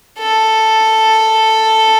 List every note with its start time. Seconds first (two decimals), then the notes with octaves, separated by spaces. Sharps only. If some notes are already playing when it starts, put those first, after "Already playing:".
0.19 A4